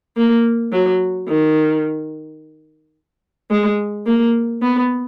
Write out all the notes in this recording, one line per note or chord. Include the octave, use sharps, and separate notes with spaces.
A#3
F#3
D#3
G#3
A#3
B3